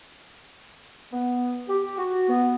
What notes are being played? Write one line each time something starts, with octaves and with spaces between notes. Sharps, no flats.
B3
G4
F#4
B3